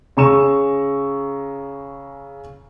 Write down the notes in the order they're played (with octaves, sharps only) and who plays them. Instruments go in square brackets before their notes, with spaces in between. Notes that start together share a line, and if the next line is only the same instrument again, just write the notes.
[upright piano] C#3 G#4 A#5 C#6 E6 E7